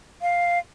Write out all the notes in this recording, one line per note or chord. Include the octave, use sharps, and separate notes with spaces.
F5